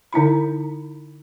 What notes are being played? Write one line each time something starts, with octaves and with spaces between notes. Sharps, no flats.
D3 D#4 E4 B5